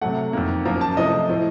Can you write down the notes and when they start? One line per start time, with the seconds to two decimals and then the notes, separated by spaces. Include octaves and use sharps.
0.01 C3 F#3 A3 F#5
0.33 F2 D#3 A#3
0.65 F#2 F3 A#3 A#5
0.81 A5
0.97 C3 F3 A3 D#5
1.29 A2 F3 A3